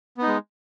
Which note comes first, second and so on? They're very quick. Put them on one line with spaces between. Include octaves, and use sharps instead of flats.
B3 D#4 G#3